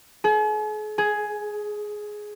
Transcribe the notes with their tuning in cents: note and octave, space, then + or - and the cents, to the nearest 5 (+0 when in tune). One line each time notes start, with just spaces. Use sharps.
G#4 +45
G#4 +10